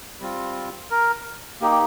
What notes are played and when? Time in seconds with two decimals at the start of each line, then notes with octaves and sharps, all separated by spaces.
0.20 G3 C4 F4
0.91 A#4
1.61 A#3 D#4 G4
1.72 G4